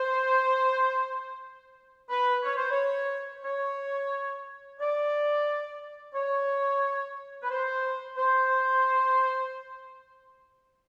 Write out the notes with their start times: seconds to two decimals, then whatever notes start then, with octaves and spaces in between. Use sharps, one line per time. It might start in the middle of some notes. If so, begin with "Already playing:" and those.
Already playing: C5
2.10 B4
2.43 C#5
2.57 C5
2.71 C#5
3.44 C#5
4.80 D5
6.15 C#5
7.42 B4
7.50 C5
8.17 C5